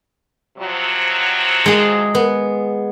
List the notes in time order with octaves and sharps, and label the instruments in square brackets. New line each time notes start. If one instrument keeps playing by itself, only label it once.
[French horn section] C3 F3 F#3
[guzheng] G#3 G#4
B3